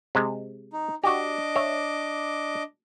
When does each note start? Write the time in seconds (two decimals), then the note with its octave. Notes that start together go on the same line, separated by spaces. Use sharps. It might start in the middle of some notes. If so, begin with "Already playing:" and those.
0.15 C3 G#3
0.73 D#4
1.04 D4 F#4 G4 D#5 D6
1.56 C#5 E5